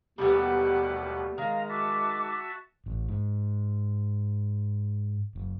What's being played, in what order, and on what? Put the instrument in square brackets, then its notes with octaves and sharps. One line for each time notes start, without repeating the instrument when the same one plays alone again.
[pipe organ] D#2 B2 [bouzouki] G3 A3 B3 [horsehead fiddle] G4 F#5
[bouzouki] D#3 [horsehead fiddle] G#3 [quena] F5 [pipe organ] A#5
[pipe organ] F#4 E5 A5 [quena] D6
[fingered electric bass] A1
G#2
F#1